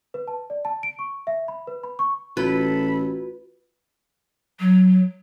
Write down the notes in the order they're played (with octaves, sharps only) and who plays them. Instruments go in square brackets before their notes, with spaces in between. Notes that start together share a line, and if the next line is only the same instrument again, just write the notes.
[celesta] B4
A5
D5
A5
D7
C#6
E5
B5
B4
B5
C#6
[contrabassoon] A1 [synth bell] F4 F#4 [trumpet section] A4 B5 [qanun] B4
[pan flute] F#3